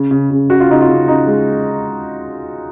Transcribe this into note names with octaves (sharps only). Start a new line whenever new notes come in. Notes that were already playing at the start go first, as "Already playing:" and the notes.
Already playing: C#3
C#3
C#3
C#3 F#4
F4
C#3 D#4
F4
C#3
C#3 D#4
G#3